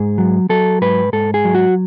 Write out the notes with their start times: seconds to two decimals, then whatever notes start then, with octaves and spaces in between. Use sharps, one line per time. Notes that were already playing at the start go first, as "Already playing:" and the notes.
Already playing: G#2 G#4
0.18 F#3
0.49 F#3 A4
0.82 G#2 B4
1.13 G#2 A4
1.34 G#4
1.45 F#3
1.55 F#4